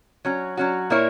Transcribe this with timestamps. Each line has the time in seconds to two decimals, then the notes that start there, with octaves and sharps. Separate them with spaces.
0.25 F#3 C#4 F#4
0.57 F#3 C#4 F#4
0.90 A#2 A#3 E4 A#4 C#5